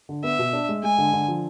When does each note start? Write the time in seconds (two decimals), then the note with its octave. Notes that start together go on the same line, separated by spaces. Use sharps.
0.09 D3
0.24 B3 E5
0.39 B2
0.53 D4
0.69 G#3
0.83 G#3 G#5
0.98 D3
1.13 D3
1.28 F3